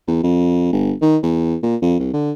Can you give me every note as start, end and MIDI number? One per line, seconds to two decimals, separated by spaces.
0.08 0.18 40
0.23 0.70 41
0.72 0.93 31
1.02 1.17 51
1.23 1.56 40
1.63 1.76 46
1.82 1.97 41
1.99 2.09 36
2.13 2.32 50